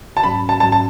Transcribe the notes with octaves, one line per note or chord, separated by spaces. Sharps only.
A5
G#2 F#3 C#4 B5
A5
G#2 F#3 C#4 A5
A5